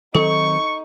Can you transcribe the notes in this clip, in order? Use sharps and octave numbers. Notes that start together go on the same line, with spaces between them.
D#3 F#3 C4 D#4 A4 C#6